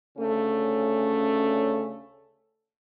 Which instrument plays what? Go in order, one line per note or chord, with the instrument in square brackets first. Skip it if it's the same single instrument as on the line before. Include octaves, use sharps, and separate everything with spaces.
[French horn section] D2 C#3 A3 C#4